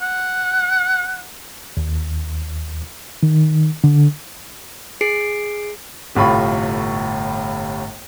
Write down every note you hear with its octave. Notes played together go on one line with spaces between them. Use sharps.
F#5
D#2
D#3
D3
G#4 C7 D7
G1 A2 C3 F4 B5 C#6